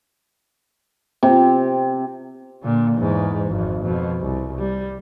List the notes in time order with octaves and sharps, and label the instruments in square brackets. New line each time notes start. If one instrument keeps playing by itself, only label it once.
[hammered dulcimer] C3
[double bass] A#2 D3
E2 G#2
G#1 F2
F2 B2
C2
G3